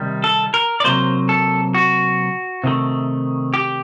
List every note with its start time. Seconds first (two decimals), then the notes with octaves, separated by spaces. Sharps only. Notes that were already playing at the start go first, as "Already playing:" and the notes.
Already playing: C3 D#3 G3
0.24 A4
0.54 A#4
0.80 D5
0.84 C3 F#3 A#3 C5
1.29 A4
1.74 F#4
2.64 C3 D#3 A3
3.54 G4